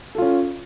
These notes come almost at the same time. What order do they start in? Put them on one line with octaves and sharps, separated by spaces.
A4 F4 C#4